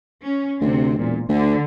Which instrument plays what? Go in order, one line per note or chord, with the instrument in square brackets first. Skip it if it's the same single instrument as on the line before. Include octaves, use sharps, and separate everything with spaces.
[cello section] C#4
[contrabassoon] D2 [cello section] C3 C4
[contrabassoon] E1 [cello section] A#2
[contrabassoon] D2 [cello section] D3